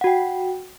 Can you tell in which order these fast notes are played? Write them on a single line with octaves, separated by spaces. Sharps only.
F#5 F#4 G5